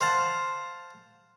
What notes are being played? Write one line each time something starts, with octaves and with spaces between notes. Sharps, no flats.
C5 F5 F#5 A5